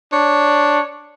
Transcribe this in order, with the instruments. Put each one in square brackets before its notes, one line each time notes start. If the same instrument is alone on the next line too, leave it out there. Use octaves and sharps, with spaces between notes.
[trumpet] D4 [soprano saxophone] C#5